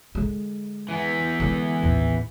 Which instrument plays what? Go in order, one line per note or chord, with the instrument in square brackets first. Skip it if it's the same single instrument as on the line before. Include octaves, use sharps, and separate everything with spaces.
[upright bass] D3 G#3
[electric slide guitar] E3 B3
[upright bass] D3 G#3
A1 D#2